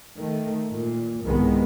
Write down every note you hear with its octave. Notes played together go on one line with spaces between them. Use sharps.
D#3 A3
A#2
C2 G#2 D#3 G#3 B3